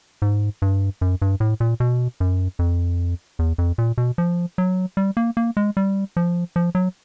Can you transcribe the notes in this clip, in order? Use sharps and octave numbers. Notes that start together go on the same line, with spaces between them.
G#2
G2
F#2
G2
A2
A#2
B2
F#2
F2
E2
F2
A#2
B2
F3
F#3
G3
A#3
A#3
G#3
G3
F3
F3
F#3